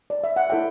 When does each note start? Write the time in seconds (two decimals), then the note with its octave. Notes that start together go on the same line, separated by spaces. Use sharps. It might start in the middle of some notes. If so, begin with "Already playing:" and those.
0.10 D5
0.24 E5
0.36 F#5
0.49 E4 A4 C#5 E5 G5